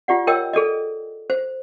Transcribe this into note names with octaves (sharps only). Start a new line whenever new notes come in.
F4 G4 D5 F#5
A#4 C#5 D#5 G5 D#6 E6
G#4 A4 D5 D#5
C5